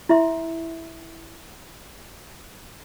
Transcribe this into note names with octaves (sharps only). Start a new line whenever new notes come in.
E4 E5 C6